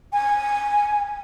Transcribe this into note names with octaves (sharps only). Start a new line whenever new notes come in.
G#5